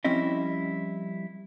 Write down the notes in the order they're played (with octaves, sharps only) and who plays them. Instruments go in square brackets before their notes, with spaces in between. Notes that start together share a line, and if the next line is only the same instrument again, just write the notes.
[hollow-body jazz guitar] F3 G3 C4 C#4 E4 D#5